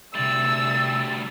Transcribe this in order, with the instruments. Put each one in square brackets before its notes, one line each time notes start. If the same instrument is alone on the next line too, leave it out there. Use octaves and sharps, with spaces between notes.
[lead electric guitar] D2 G3 [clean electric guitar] C3 E5 [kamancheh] E6 [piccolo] A6